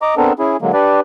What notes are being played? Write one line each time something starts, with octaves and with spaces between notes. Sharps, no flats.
D#5 A#5 D6
B3 C4 D4 A4 A#4
C#4 E4 G#4
D3 F#3 G#3 A#3
D4 G4 B4 D5